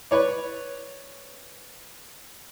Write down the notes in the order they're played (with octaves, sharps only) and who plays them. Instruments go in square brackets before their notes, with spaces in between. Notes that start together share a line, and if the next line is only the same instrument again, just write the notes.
[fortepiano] B4 C#5 D5